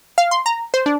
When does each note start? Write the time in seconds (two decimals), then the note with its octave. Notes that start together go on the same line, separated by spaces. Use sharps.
0.18 F5
0.31 C6
0.46 A#5
0.74 C5
0.86 D4